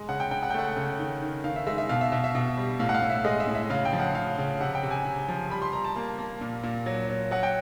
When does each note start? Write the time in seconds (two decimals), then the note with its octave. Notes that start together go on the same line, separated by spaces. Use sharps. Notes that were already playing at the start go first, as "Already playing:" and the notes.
Already playing: G#3
0.09 C#3 F#5
0.20 G5
0.31 C#3 G5
0.43 F#5
0.50 G5
0.54 A3 F#5
0.76 C#3
0.99 D#3
1.22 D#3
1.44 D#3 F5
1.56 E5
1.67 G#3 E5
1.78 E5
1.89 B2 F5
2.01 E5
2.12 B2 E5
2.24 E5
2.35 B2
2.57 G3
2.80 A2 F5
2.89 F#5
2.94 F5
3.02 A2
3.10 E5
3.25 G#3 D#5
3.40 E5
3.47 A2
3.55 E5
3.70 C#3 F5
3.85 G5
3.93 F3
4.00 F#5
4.15 C#3 F5
4.38 C#3
4.60 C3 F#5
4.75 G5
4.83 C3
4.91 G#5
5.06 C3
5.28 F3
5.50 G3 B5
5.62 C6
5.73 G3 A#5
5.84 A5
5.96 A#3 A5
6.18 A#3
6.41 A#2
6.63 A#2
6.86 F#3
7.09 F#3
7.31 F#3 F#5
7.43 G5